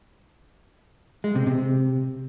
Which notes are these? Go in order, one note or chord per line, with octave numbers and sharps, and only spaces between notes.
G#3
C3
C3